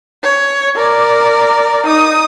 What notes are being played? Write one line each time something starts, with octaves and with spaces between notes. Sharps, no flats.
C#5
A#4 D5
D#4 D#6